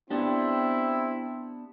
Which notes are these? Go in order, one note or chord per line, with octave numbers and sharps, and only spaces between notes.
B3 C4 D4 E4 G4